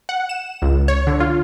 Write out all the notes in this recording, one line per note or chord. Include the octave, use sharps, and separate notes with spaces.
F#5
E7
C#2
C#5
D3
F4